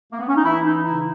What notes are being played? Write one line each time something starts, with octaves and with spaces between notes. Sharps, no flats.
A#3
B3
C#4
D#4
E3 E4
D#4
C#3 E4